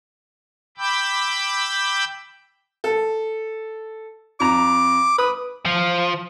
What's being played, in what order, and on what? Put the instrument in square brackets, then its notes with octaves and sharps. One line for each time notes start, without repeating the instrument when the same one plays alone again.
[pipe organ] G5 B5 D6 E6 G6
[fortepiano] A4
[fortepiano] F2 A#5 [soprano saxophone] D6
[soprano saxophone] B4 [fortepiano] D#6
[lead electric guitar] F3